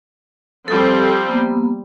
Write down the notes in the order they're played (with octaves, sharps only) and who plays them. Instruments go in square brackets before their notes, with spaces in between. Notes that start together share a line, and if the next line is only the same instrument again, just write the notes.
[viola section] F3 G3 C4 [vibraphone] A4
[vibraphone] A#3 B3